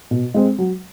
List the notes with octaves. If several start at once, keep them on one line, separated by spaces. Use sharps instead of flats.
B2
G#3 C4
F#3